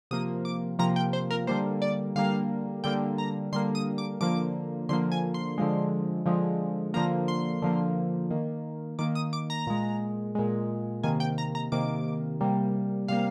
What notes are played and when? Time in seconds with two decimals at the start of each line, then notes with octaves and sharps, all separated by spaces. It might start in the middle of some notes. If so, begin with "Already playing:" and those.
0.11 C3 F3 A#3 D#6
0.45 D6
0.79 C3 F3 A#3 A#5
0.96 G5
1.13 C5
1.31 A#4
1.47 D3 G3 A#3 C5
1.82 D5
2.16 D3 G3 A#3 F5
2.84 D3 G3 A#3 G5
3.18 A#5
3.52 D3 G3 A#3 C6
3.75 D#6
3.98 D6
4.21 D3 F3 A#3 D6
4.89 D3 F3 A#3 C6
5.12 G#5
5.34 C6
5.58 D3 F3 G#3
6.26 D3 F3 G#3
6.94 D3 F3 A#3 A#5
7.28 C6
7.62 D3 F3 A#3
8.31 D#3 A#3
8.99 D#3 A#3 D6
9.15 D#6
9.33 D6
9.50 A#5
9.67 A#2 G#3
10.35 A#2 G#3
11.03 C3 D#3 A#3 G#5
11.20 G5
11.38 A#5
11.55 A#5
11.72 C3 D#3 A#3 D6
12.40 C3 G3 A#3
13.08 C3 G3 A#3 F5